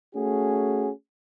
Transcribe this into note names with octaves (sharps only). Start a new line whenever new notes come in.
A3 C#4 F#4 G#4